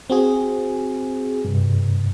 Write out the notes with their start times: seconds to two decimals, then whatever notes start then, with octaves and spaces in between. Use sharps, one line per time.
0.10 C4 F#4 G#4
1.45 G2 C3